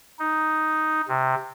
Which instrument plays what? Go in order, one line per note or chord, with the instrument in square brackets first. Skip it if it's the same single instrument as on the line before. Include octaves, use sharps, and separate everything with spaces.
[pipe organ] D#4
C3